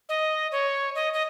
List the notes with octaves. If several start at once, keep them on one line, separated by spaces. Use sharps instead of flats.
D#5
C#5
D#5
D#5